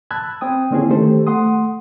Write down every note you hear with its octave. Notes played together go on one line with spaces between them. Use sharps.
A5 B5 E6 F#6 G#6
C4 G5 D#6
D3 A#3 C4 C#4 E4 G#4
D#3 A3 G4 A4 C5
A3 F#5 C6 D#6